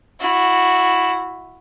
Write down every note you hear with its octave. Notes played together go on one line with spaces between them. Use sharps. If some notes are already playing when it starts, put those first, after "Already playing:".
E4 F#4